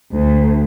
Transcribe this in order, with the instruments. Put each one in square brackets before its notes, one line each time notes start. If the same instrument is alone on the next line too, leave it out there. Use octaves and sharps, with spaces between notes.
[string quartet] D2